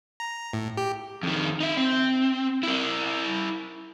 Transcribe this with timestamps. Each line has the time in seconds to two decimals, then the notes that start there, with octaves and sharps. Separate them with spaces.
0.20 A#5
0.53 A2
0.77 G4
1.23 F2 D#3
1.60 D#4 E5
1.77 C4
2.63 E4 A#4